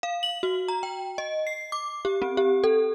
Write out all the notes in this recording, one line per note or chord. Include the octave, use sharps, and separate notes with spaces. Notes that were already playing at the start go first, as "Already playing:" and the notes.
F5
F#7
F#4
A#5
G5
D#5
C7
D6
G4
C4
G4
A4